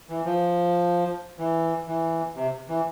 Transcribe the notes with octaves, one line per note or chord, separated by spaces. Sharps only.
E3
F3
E3
E3
C3
E3